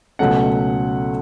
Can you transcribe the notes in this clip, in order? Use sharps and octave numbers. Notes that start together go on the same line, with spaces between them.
C#2 B2 F#3 A3 C#4 F#5